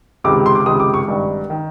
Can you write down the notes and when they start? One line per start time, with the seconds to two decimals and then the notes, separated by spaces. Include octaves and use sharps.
0.24 C#2 C3 D#3 D6
0.46 C6
0.55 D6
0.66 C#2 C3 D#3 D#6
0.80 D6
0.94 C#6
1.07 G#1 G2 D#3
1.50 D#3